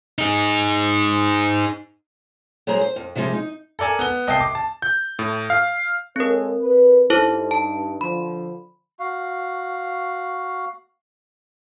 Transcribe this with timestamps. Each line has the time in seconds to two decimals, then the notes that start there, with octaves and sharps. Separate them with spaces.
0.18 D#4 G#4
2.67 F#3 G#3 G#4 C5 A#5
2.81 C5
2.96 F2
3.15 C3 F3 G3 G#3
3.34 D#4
3.79 A4 A#4 D5 G#5 A5
3.99 B3 G7
4.27 C2 D#5 G5 A5 C7
4.41 D6
4.55 A5
4.82 G6
5.19 A2
5.50 F5
6.16 G#3 C4 A4 A#4 C#5
6.61 B4
7.10 G2 D#4 E4 A4 C5
7.51 A5
8.01 D3 F3 B5
8.99 F#4 F5